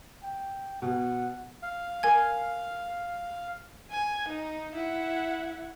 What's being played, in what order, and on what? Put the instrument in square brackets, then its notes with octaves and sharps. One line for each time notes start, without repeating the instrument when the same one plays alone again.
[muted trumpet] G5
[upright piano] B2 [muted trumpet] F#5
[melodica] F5
[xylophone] A#4 G#5 G#6
[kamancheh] G#5
D#4
E4 F#5